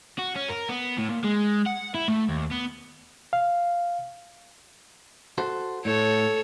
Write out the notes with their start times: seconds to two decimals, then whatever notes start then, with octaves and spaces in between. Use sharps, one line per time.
0.19 F#4
0.36 C#4
0.49 A#4
0.69 B3
0.97 A2
1.09 A#2
1.24 G#3
1.66 F#5
1.95 E4
2.08 A3
2.28 D#2
2.51 B3
3.33 F5
5.38 F#4 A4 C5
5.85 A2 A4 C#5